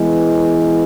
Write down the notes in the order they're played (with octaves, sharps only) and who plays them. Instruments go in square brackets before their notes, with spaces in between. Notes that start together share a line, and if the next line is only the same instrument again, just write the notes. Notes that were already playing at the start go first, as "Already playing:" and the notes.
Already playing: [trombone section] E3 G#3 B3